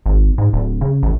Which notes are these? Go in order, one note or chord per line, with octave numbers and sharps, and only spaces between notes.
G#1
G#2
D1
C#3
A1